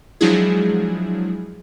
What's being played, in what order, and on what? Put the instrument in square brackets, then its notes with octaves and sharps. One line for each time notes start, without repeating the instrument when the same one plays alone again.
[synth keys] F3 F#3 G#3 D4 E4 G#4